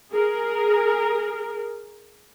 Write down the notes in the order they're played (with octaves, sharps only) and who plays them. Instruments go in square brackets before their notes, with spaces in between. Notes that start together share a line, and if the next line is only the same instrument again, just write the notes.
[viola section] G#4 A#4